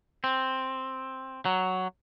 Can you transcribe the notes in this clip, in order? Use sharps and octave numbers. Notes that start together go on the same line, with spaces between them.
C4
F#3